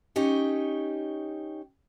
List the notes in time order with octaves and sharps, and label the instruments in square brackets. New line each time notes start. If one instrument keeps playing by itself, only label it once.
[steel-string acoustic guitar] C#4 D#4 G4 C#5